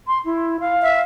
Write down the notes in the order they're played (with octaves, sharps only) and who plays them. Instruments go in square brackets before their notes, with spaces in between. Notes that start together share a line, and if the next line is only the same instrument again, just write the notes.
[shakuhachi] C6
E4
F5
[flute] E5